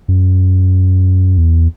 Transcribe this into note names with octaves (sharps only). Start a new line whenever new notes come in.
F#2
E2